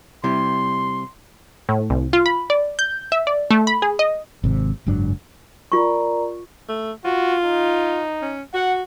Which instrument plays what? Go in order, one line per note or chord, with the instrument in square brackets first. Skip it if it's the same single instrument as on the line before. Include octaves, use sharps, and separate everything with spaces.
[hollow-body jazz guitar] C3 G3 E4 [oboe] C6
[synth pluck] A2
C2
F4
B5
D5
G6
E5
D5
A3
B5
G#4
D#5
[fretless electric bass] G#1 C3
F#1 G#2 F#3 D4
[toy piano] F4 C#6 [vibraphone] A#4 D5 A#5
[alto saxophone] A3
[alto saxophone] F4 [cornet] F#4
[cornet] D#4
[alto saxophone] C#4
[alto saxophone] F#4 [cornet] F#5